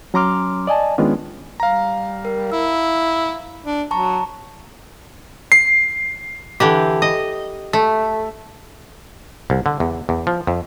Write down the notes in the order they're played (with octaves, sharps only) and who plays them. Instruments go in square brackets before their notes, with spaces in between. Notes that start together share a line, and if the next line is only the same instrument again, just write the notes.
[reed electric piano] F#3 C#4 A#5 C6 D6 F6
D5 D#5 G#5 A5
D#3 G#3 B3 C#4 D4 F4
[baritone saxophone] G3 [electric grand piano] F5 A#5
[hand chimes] A#4
[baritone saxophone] E4 [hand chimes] E6
[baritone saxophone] D4
[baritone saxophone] F#3 [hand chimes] A5 A#5 C#6
[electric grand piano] C7
[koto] D3 E3 G4
D#5
A3
[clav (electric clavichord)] C2
D3
E2
E2
F3
F2